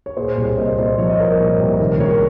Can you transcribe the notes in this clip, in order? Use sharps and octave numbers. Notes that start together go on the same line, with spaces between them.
C#5
A#2 G#4 C5
C2
A#2 C5 D#5
A#2 C5 D#5
F3 C#5
D#5
C2 A#4 C#5
A#2
C2
D#3
C#2 A#4 C#5